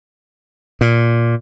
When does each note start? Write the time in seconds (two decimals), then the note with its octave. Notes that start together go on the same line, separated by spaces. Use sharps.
0.81 A#2